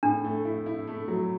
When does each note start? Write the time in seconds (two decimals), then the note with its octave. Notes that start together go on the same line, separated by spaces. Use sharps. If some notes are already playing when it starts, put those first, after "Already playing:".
0.03 A2 D4
0.24 A3
0.45 E4
0.66 E4
0.87 A3
1.08 F#3